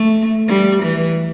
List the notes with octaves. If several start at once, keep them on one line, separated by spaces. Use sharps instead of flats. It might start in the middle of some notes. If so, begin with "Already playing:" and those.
Already playing: A3
G3
E3